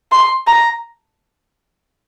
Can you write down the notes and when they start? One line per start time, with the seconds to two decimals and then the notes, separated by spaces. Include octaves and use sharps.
0.12 C6
0.47 A#5